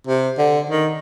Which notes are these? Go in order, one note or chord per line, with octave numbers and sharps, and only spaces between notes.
C3
D3
D#3